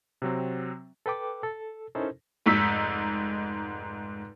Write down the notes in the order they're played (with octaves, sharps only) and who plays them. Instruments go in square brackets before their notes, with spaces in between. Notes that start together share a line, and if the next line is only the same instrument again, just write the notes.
[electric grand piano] C3 F#3 C4
[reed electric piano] A4 B4 G5 D6
A4
C#4 D#4 E4 A4 A#4 C5
[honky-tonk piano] F1 G#2 D#4 E6 B6